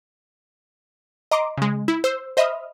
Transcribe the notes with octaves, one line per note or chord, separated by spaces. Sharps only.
D#5 A#5 C6 D6
C#3 G#3
E4
C5 E6
C5 D#5 E5 B5 D#6 F6